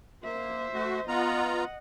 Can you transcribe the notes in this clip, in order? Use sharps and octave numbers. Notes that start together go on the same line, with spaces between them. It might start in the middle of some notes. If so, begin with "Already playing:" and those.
A#3 C5 E5
A3 F#4
B3 F4 D#5 F#5 A#5